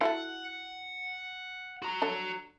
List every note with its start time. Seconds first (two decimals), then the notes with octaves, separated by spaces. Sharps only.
0.01 E4 F#4 A4 F#5
1.83 F#4 A#5
2.02 D3 A4 C#5